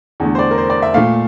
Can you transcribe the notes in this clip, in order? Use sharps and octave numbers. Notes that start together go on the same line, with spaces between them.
E2 D3 A3
C5
D5
A#4
C5
D5
E5
A#2 A3 F5